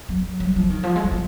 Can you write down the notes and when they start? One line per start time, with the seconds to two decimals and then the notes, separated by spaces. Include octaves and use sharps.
0.09 F#3
0.40 F#3
0.56 F3
0.70 D#3
0.83 F3
0.95 G#3
1.04 F#3
1.12 F3